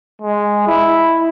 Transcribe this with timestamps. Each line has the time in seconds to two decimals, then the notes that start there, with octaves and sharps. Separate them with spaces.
0.22 G#3
0.67 E4